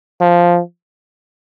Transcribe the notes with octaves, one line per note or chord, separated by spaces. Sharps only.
F3